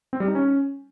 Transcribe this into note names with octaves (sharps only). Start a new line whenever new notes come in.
C4
G3
D#4
C#4